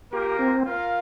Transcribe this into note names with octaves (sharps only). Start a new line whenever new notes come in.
A#3 F4 G4 A#4
C4
F4 A#4 F5